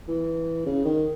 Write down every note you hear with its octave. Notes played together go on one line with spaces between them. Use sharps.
E3
C#3
D#3